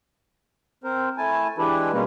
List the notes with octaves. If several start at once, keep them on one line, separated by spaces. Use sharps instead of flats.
C4 A#4 C5
A3 E4 G#5 A5
E3 G#3 D4 E4 G4 B4
B2 G3 G#3 A#3 C#4 B4